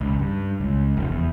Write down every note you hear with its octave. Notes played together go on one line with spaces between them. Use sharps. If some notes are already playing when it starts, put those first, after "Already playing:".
C#2
G2
C#2
F1
E2